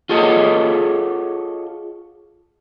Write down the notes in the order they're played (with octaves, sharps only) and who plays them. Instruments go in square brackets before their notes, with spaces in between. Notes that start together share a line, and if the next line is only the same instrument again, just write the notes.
[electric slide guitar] F4 F#4 G#4 A4 C#5 D#5